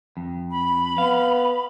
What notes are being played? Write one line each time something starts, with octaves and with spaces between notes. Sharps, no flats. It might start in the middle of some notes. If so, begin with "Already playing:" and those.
F2
B5
B3 F5